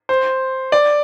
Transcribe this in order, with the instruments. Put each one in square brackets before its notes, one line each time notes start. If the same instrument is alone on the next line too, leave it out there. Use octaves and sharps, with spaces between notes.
[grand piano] C5
D5